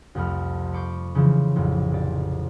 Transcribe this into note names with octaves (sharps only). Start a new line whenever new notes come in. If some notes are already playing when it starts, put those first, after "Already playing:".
C2 F2 A3 B5 F6
B5 C#6 D6 G6 C7
C#3 E3 F3
A1 F2 A2 F#3
F1 D5